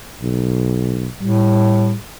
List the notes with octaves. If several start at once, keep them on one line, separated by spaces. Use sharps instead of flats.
B1
A2 G3